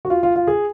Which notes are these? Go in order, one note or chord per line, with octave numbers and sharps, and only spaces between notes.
F#4
F4
F4
F4
G#4